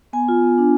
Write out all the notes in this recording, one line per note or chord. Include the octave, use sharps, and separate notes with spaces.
B3 G#5
F4
B3
D4